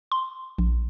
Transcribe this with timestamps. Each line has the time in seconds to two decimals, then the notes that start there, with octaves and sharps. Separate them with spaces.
0.12 C6
0.58 A#1